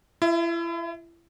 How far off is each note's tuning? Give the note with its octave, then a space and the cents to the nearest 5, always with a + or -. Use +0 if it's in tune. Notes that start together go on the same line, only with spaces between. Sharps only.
E4 +35 E5 -15